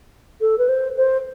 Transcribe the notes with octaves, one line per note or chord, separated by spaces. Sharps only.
A4
B4
C5
C5